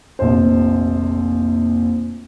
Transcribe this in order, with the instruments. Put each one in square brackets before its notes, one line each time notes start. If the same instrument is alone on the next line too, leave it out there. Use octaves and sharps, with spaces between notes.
[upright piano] F1 A#1 C5